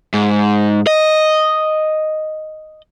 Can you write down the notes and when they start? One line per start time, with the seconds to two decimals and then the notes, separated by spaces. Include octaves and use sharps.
0.14 G#2
0.87 D#5